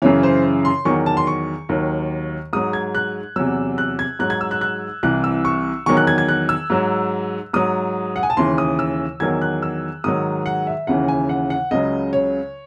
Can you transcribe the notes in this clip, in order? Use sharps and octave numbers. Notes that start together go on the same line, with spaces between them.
F#2 C#3 E3 C#5
C5
C6
E2 D#3 F#3 C#6
A5
C6
C#6
D#2 D#3 F#3
G#2 F#3 D#6
G#6
F#6
E2 C3 F#3 E6
F#6
G#6
G#2 F#3 F#6
G#6
E6
F#6
F#6
C2 C3 E3 F#6
E6
C#6
E2 D#3 F#3 C#6
F#6
G#6
G#6
F#6
E6
G#2 F#3
G#2 F#3 D#6
F#5
G#5
A5
D#2 C#3 E3 C6
D#6
E6
E2 D#3 F#3 G#6
F#6
E6
G#2 D#3 F#3 D#6
F#5
E5
D#2 C#3 E3 F#5
G#5
F#5
F#5
C#2 C#3 F#3 D#5
C#5